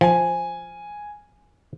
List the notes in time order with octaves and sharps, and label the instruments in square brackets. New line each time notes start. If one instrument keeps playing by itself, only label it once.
[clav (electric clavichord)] F3 [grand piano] G#5